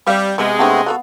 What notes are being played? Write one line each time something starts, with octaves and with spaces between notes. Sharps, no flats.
G3 C4 E5 F5
C3 G#3 B3 E5
A3 B3 C4 D4 G4 A4
B3 F#4 A4 F5 F#5